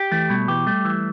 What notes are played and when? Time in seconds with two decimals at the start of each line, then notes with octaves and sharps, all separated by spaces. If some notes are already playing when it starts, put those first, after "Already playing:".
Already playing: G4
0.12 E3 A3
0.30 B2 G3
0.48 E3 G4
0.66 G3 A3
0.85 E3